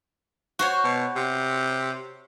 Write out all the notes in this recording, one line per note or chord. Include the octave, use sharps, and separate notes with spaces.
F#4 C5 C#5
B2
C3